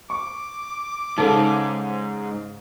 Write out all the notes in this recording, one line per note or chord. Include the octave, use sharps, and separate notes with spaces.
C#6 D6
G#2 C#3 D#4 A4